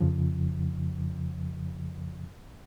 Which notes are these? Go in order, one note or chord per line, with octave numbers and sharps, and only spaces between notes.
F2 C#3 F3